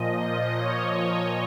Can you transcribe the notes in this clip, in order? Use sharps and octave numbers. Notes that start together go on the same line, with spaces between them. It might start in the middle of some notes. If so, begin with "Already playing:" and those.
Already playing: A#2 F3 D#5
D#5
C#5